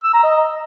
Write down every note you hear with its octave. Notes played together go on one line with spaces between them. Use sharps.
E6
A#5
D#5